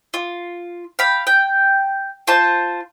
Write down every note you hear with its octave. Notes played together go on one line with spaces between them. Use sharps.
F4
F5 G5 B5
G5
F4 C5 A5